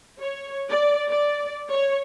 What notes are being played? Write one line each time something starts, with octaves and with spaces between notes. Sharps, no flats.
C#5
D5
D5
C#5